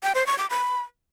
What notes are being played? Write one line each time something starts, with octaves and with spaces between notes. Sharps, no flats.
G5
C5
C#6
D6
B5